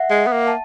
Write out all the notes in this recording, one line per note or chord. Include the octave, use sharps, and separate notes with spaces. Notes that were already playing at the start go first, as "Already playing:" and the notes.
Already playing: E5 F#5
G#3
B3
A#3
A5